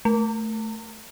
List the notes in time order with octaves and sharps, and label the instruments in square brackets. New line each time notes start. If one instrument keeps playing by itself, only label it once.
[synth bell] A3